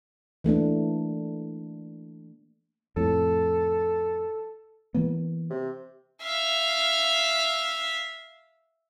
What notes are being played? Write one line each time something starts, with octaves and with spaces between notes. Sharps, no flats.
E3 A3 A#3 D4
F2 A2 A4
E3 A#3 B3
C3
E5 F5